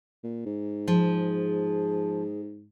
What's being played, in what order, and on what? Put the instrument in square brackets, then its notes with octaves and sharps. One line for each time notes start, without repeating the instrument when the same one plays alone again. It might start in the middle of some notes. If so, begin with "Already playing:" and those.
[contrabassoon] A#2
G#2
[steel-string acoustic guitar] F3 [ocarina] G#4